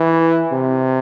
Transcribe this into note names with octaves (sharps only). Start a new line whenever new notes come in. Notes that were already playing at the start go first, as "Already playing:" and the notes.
Already playing: E3
C3